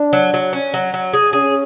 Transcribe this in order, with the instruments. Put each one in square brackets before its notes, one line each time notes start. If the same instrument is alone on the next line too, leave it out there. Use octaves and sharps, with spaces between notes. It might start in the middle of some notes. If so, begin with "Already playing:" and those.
Already playing: [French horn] D4
[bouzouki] F#3
F#3
C#4
F#3
F#3
G#4
[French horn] C#4 [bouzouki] G#4